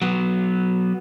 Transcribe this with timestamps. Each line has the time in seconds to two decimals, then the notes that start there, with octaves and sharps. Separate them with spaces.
0.02 F#3 B3